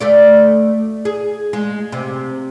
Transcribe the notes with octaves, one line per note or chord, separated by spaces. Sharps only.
D2 A3 D5
G#4
G#3
C3